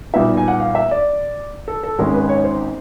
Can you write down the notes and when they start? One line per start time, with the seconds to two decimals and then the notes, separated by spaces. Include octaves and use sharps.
0.13 B1 A#2 G3 B3 D#4 E5
0.37 G#5
0.48 F#5
0.60 F5
0.75 E5
0.91 D5
1.68 A4
1.83 A4
1.98 G#1 G#2 D#3 G#3 C#4 A#4
2.14 B4
2.29 C#5
2.44 C5